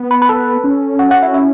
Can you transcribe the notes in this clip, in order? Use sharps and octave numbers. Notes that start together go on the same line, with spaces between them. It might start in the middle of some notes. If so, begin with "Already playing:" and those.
Already playing: B3
B4
B4
A4
C#4
F#4
F#4
E4
E4